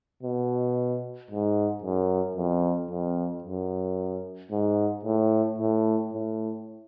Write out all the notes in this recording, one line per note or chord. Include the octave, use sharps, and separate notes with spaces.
B2
G#2
F#2
F2
F2
F#2
G#2
A2
A2
A2